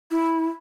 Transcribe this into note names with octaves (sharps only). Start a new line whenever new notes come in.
E4